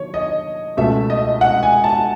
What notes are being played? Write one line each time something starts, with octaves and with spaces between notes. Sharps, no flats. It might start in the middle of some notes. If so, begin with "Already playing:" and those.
Already playing: D#3 F#3 C#5
D#5
C#2 B2 A3 C#4 E5
D#5
F#5
G#5
A5